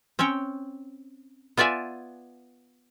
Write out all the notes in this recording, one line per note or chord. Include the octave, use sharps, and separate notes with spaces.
C4 C#4 C#5 G5
B3 F4 D5 E5 G#5